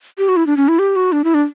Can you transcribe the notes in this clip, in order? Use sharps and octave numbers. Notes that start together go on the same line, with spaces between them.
G4
F#4
E4
D4
C#4
E4
G4
F#4
D4
E4
D4